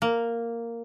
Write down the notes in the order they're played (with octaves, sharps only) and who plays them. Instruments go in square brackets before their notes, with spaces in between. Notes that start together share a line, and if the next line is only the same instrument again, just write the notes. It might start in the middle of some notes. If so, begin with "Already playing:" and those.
[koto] A#3